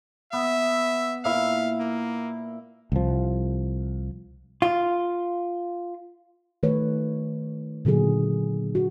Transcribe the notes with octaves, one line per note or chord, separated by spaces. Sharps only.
B3 E5
A#2 E4 E5 F5
A#3
C2 F3
F4
D#3 A3 B4 C#5
A#2 D3 F#3 G#4
F#4